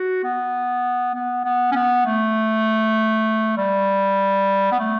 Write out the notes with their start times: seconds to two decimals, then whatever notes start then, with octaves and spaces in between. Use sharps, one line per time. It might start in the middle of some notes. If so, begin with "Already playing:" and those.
Already playing: F#4
0.24 B3
1.14 B3
1.45 B3
1.72 C#4
1.75 B3
2.06 A3
3.57 G3
4.72 B3
4.80 A3